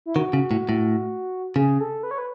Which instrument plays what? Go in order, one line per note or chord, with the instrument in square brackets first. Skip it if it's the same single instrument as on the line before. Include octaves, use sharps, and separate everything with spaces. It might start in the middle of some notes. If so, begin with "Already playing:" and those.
[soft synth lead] E4
[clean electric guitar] D#3 [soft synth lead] F#4
[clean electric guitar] C#3
A2
A2
[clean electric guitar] C#3 [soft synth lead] G#4
[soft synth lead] A4
B4
C#5
B4